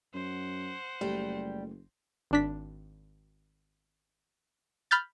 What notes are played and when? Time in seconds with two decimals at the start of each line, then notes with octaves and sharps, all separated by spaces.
0.14 F#2 C5 F#5
1.01 F#1 G3 A3 G5
2.31 G#1 D4 B6
4.91 B5 F6 G6 A6